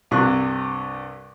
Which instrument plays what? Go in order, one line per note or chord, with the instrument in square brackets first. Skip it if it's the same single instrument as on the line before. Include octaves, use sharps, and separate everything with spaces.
[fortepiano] C2 G2 C3 C#6 F#6